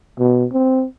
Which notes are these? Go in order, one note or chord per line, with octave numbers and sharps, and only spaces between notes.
B2
C4